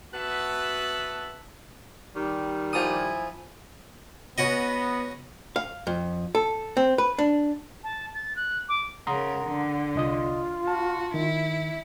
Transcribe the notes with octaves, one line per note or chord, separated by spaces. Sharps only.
B3 F#4 B4 E5 A5
D#3 G3
F3 E4 G#5 D#6
B3 C#4 F#4 D#5
F5
F2
A4
C4
B4
D4
A5
A6
F#6
D6
C#3 A#4 F#5 A#5 C6 D#6
D3
C2 F4 D#5 D#6
F#4 A5
D#3 E4